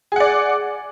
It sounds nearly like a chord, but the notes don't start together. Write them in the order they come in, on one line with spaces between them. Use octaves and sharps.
G#4 F#5 D5